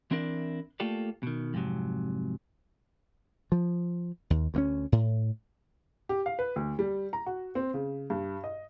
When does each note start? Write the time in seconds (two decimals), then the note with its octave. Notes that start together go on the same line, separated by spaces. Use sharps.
0.11 E3 C4 D4 E4 A#4 D5
0.80 A3 A#3 F4 G4 A4 D5
1.23 B2 D#3
1.54 F2 G#2 C3 F#3
3.52 F3
4.30 D#2
4.54 D2 A#3 C#4
4.92 A2
6.09 G4
6.26 F5
6.39 B4
6.56 D2
6.79 G3
7.13 A#5
7.26 F#4
7.55 C4
7.74 C#3
8.10 G2
8.44 D#5